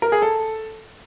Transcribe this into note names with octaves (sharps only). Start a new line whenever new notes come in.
A#4
G#4
A4